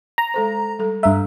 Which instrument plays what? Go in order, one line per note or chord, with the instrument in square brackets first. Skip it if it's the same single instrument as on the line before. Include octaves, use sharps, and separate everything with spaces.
[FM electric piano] A#5
[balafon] G#3 A4 C5
G3 A4
[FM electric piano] G2 E5 [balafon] D4 F5 A#5